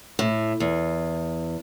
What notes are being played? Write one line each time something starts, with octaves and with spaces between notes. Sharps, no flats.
A2
E2